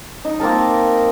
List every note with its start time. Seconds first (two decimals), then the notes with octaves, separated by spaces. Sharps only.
0.25 D#4
0.40 A#3 C4 A#4 A5